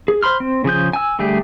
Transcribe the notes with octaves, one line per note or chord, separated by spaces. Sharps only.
G#4
C5 B5 C6 F6
C4
C#3 F3 G#4 G6
G#5 E6
D3 G3 A3 G4 G#4